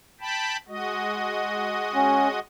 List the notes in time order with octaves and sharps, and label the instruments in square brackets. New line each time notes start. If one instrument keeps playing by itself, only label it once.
[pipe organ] G5 A5 B5
G#3 F#4 D#5
[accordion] C#4